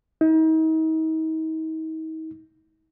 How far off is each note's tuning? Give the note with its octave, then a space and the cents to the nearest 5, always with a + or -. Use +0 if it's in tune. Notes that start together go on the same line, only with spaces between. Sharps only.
D#4 +40